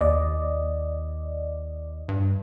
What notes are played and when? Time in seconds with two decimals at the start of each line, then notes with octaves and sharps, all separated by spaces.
0.01 D#2 D5 D#5
2.08 G2